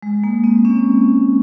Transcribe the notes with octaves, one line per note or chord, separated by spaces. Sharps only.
G#3
A#3
C4
C#4